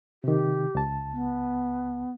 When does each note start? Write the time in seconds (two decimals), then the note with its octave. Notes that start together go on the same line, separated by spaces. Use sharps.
0.24 C3 D#3 G4
0.75 C#2 A5
1.13 B3